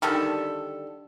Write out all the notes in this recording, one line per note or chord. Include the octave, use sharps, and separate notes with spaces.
D3 D#3 G3 A4